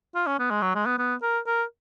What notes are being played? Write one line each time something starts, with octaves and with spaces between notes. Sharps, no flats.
F4
C#4
B3
G#3
F#3
G#3
B3
B3
A#4
A#4